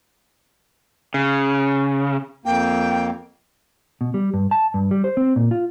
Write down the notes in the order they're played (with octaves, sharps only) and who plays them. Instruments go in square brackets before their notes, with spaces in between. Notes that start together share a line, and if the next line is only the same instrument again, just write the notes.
[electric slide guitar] C#3
[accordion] F2 A#3 [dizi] G5
[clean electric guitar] B2
G3
G2
A5
G2
G3
C5
C4
A#2
F4